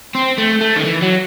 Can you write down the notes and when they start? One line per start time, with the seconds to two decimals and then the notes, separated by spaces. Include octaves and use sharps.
0.15 C4
0.38 A3
0.61 A3
0.76 D#3
0.84 E3
1.02 F#3